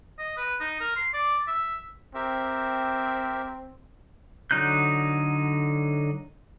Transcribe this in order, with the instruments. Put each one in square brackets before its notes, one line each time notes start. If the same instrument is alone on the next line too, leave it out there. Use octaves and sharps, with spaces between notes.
[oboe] D#5
B4
D#4
A#4
C6
D5
E5
[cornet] C4 [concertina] G4 A#4 E5
[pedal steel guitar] D3 F#3 D#4 F#6 G6